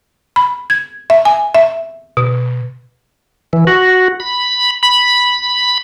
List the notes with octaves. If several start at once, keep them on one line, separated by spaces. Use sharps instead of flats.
B5
G#6
E5
G#5
E5
B2
E3
F#4
B5
B5